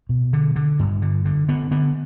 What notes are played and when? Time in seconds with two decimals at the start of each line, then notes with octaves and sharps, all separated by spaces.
0.09 B2
0.33 D3
0.56 D3
0.79 G2
1.02 D3
1.25 D3
1.48 D3 B3
1.71 D3 B3